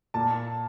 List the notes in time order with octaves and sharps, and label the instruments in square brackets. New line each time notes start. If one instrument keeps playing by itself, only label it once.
[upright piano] A#2 A5